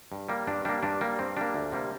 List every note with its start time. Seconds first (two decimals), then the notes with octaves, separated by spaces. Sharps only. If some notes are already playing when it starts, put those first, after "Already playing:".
0.12 G2
0.29 G3 A#3
0.47 G2 D4
0.65 G3 A#3 D4
0.83 G2 D4
1.01 G3 A#3
1.19 G2 C4
1.37 G3 A#3 D4
1.54 D2
1.72 C3 G3 A#3